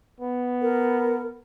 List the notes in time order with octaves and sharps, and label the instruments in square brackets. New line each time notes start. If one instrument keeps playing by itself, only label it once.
[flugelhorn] B3
[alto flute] A#4